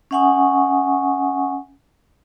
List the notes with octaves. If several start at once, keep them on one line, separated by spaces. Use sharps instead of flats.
C#4 E5 F#5 G#5 C#6 D#6